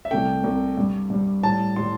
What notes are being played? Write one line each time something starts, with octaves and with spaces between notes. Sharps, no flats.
E5
C2 C3 A3 G5
C2 C3 A3
G2 G3
G2 G3
A2 G3 A5
A2 G3 C6